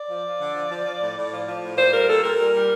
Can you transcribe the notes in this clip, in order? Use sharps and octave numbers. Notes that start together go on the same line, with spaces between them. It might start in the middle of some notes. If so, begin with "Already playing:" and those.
Already playing: D5
F3
F3
D3
F3
F3
F3
A2
A2
F3
F3
A2
A#2 C5
G3 A#4
A#2 A4
A#2 A#4
G3
G3